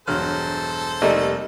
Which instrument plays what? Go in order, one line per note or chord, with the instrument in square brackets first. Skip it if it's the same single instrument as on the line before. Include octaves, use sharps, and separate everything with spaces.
[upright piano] E1 [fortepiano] G2 F#3 F6 [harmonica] A4 C5
[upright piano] F1 D#4 D5 [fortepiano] G3 A3 A#3